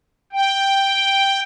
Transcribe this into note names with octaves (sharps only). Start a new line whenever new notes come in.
G5